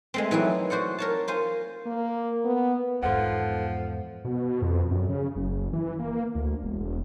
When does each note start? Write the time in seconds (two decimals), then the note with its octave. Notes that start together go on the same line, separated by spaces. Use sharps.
0.14 G#3 A3 C4
0.31 E3 F#3 D#4 E4
0.70 F#4 C5 D5 F#5
0.98 A#4 C#5 A5
1.28 F4 C5 G#5
1.86 A#3
2.45 B3
3.03 E2 G#2 F3 A4 F#5
4.24 B2
4.62 F2
4.91 F#2
5.09 C#3
5.36 F#1
5.73 E3
5.99 A#3
6.35 D2
6.64 E1